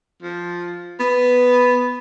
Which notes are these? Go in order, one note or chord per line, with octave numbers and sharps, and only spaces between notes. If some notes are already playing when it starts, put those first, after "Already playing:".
F3
B3